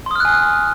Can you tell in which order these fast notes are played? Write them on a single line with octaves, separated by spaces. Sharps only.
C6 D#6 F6 F#6 G#5